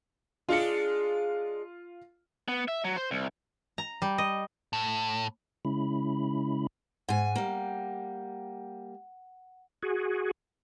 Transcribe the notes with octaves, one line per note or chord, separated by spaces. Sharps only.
G#3 D4 F4 G#4 C#7
B3
E5
F#3
C5
C2
A#5
G3
D#5
A2
C#3 G#3 C#4 E4 B5
G#2 F#5 G#5
G3 A#3
F#4 G#4